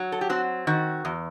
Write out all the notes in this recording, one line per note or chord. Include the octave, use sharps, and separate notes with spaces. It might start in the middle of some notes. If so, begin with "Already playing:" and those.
Already playing: F#3
A4
G4
C4 F#4
D#3 F#4
E2